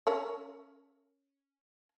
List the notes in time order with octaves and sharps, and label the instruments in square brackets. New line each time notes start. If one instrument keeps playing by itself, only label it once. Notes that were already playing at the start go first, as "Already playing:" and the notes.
[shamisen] C#4 A#4 C#5